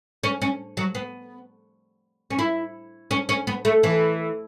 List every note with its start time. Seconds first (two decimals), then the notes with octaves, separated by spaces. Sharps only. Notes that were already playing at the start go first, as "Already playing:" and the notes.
0.24 C#4
0.42 C#4
0.77 F#3
0.95 B3
2.30 C#4
2.39 E4
3.11 C#4
3.29 C#4
3.47 B3
3.65 A3
3.83 E3